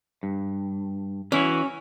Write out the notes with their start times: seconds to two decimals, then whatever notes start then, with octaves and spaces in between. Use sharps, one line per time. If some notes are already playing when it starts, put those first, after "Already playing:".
0.23 G2
1.32 E3 C#4 E4 F#4